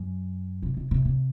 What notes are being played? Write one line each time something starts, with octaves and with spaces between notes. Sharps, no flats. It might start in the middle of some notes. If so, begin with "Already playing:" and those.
Already playing: F#2
C3
C3
C3
C3